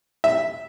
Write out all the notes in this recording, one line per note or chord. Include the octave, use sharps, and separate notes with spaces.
E5